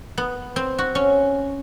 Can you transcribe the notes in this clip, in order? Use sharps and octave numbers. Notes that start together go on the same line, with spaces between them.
B3
C4
F#4
C#4